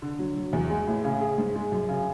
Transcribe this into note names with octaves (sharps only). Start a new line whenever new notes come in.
D3
F#3
F#3
E2
G#3
A2
C#3
G#4
G#2
G#3
F#2
C#3